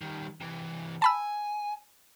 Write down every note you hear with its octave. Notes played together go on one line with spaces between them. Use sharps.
D#3 G3
C3 E3
G#5 A5 B5 E6